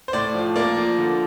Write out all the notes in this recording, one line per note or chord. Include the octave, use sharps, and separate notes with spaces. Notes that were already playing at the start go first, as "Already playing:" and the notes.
C5
A2 D5
F3
A#3 D5
F3
D3